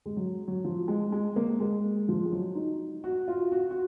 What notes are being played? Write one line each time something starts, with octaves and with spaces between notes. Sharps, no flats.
G#3
F#3
F#3
F3
G#3
G#3
A#3
G#3
F3
G#3
F#3
D#4
F#4
F4
F#4
F#4